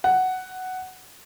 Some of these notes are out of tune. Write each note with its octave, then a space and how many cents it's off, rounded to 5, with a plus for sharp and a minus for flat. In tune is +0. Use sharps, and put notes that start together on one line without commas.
F#5 +5